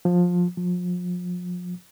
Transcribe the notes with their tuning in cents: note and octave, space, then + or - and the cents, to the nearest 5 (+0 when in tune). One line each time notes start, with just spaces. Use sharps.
F3 +20
F3 +35